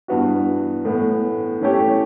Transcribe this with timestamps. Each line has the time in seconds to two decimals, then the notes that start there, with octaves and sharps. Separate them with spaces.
0.08 G2 E3 B3 F#4
0.85 A2 E3 B3
1.61 E3 A3 C#4 G4 C#5